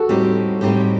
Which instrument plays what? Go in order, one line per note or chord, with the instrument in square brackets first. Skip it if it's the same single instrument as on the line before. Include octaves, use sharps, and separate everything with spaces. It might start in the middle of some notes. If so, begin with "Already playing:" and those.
Already playing: [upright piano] F#4 A4
[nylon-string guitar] A2 G3 C4 D#4 G4
A2 G3 C4 D#4 G4